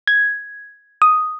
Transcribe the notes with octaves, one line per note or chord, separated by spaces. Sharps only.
G#6
D#6